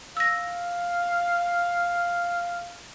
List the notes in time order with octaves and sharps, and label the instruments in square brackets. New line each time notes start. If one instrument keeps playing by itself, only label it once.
[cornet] F5 [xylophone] E6 A#6